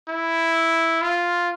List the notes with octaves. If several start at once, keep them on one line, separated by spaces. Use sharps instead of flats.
E4
F4